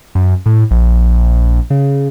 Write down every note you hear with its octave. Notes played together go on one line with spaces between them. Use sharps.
F#2
A2
A#1
C#3